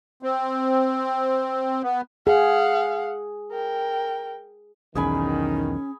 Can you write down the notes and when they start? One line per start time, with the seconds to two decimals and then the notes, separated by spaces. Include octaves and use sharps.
0.22 C4
1.83 B3
2.27 G#4 F5 F#5
3.52 A#4 G5
4.95 B1 E2 D#3 C#4 G#4 G#5 B5